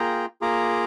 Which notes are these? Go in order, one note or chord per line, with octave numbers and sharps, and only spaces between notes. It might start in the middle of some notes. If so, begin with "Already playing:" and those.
Already playing: A#3 F4 G#4 G5 A#5
A#3 F4 G#4 A#5 D6